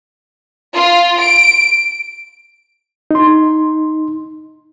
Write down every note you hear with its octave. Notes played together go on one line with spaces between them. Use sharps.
F4
D7
D#4 C6